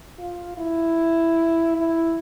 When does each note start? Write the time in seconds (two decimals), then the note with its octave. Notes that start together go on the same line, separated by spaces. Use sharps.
0.19 F4
0.57 E4
1.76 E4